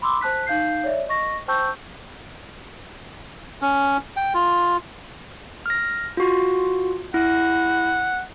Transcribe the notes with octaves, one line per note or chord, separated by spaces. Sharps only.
B5 C6 D6 E6
C5 A5 F#6 B6
D#4 F5 G6 C7
C#5 D5 E5
D#5 C#6 A#6
C5 G5 A5 C#6 E6 G6
C#4
G5
F4
F6 A#6
F4 F#4
E4 F#5